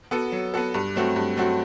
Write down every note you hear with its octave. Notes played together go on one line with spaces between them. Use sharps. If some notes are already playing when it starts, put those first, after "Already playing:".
B3 F#4 A4
F#3
B3 F#4 A4
G2
F#3 A3 C4 F#4
G2
F#3 A3 C4 F#4